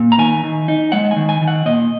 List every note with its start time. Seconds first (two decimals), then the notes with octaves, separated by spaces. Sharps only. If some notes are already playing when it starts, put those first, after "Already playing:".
Already playing: A#2
0.12 A#5
0.18 D#3 G#5
0.43 D#3
0.68 D#4
0.92 G#3 F#5
1.11 G#5
1.16 D#3
1.29 G#5
1.41 D#3
1.48 F#5
1.66 A#2 D#5